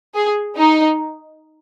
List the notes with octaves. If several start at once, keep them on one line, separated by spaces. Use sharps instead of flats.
G#4
D#4